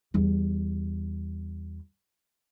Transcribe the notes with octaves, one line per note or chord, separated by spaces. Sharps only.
E2 G3